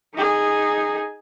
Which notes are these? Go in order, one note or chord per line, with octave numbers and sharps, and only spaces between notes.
D#4 G#4